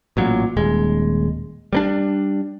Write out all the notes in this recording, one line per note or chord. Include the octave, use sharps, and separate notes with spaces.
A1 A#2 F#3
D#1 G#3
G3 A#3 D4